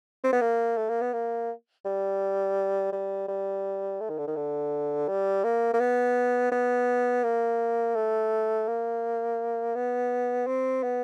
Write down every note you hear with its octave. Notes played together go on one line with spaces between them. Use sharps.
C4
B3
A#3
A3
A#3
B3
A#3
G3
G3
G3
A3
D#3
D3
D#3
D3
G3
A#3
A#3
B3
B3
A#3
A3
A#3
B3
C4
B3